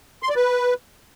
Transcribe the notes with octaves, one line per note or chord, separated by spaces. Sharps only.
C6
D5
B4